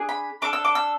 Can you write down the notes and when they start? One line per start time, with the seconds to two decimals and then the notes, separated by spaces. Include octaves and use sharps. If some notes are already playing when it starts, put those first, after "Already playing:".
Already playing: D4 G#4
0.09 B5
0.42 D4 A4 D6
0.53 E6
0.65 D6
0.75 E6